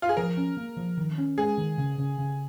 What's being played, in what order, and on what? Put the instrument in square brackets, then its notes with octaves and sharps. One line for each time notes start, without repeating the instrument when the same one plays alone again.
[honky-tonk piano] F4
G#4
[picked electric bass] F3 [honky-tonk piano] A#4
[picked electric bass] C#4
A#3
F3
D#3
C#4
[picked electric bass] G#3 [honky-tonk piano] G#4
[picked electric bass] D#3
C#3
C#3
C#3